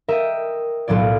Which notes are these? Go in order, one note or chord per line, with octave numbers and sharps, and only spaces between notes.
A#4 D#5 E5 G5
B1 A2 F#3 F4 D5